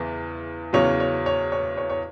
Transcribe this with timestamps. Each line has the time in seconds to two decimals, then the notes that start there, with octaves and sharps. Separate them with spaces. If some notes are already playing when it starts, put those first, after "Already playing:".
Already playing: E2 C#3 E3
0.73 E2 C#3 F#3 C#5
1.00 C#5
1.26 C#5
1.52 C#5
1.77 C#5
1.89 C#5